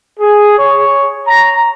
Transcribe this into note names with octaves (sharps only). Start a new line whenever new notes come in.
G#4
C#5
A#5